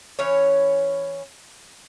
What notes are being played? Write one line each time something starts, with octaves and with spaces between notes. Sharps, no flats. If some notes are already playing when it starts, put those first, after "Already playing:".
E3 C#4 C#5